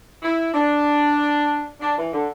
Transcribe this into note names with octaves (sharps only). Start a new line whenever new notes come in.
E4
D4
D4
E3
D3